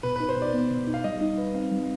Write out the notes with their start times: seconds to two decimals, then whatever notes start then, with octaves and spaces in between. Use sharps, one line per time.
0.03 B2 B4
0.16 D#4 B4
0.29 C5
0.37 B2 D5
0.54 B3
0.71 B2
0.87 D#4
0.94 F5
1.04 G3 D#5
1.21 D#4
1.38 B4
1.55 C4 F5
1.72 G3